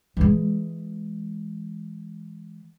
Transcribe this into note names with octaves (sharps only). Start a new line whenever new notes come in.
E3 G#3